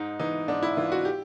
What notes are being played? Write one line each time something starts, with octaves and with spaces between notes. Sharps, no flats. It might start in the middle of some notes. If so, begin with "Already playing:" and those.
Already playing: G#2 D#4
E3 D#4
G#2 D4
E4
E3 F4
F#4
G4